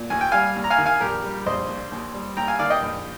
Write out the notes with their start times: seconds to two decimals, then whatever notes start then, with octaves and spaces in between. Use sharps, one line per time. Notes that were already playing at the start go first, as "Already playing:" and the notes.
Already playing: A#2
0.10 D#2 G#5
0.21 G5
0.32 G3 F5 G#5
0.56 D#2
0.64 A#5
0.70 F5 G#5
0.78 D#3
0.86 F5 G#5
1.00 A#1 G4 A#4
1.24 G3
1.46 A#1 C5 D#5
1.69 A#2
1.92 D#2
2.14 G3
2.37 D#2 G5 A#5
2.48 F5 G#5
2.59 D#3 D5 F5
2.70 D#5 G5
2.82 A#1